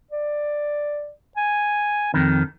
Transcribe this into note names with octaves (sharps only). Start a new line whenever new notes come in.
D5
G#5
F2 D#3 C4